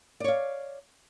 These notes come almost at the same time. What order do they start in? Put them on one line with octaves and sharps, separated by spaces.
D5 C#5 F5